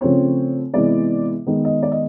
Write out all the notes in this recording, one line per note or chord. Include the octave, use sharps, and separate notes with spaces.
C#3 F3 A3 C4 C#5
C3 E3 G#3 B3 D5
D#3 G#3 B3
D#5
D5
D#5